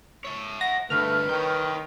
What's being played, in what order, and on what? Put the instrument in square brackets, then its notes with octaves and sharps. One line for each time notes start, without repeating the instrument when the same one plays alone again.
[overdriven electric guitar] C#5 E5
[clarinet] F#5 [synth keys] A#6
[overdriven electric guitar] D2 G2 [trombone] A3 [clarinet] B4 [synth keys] F6
[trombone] D#3 [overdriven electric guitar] C#5 G5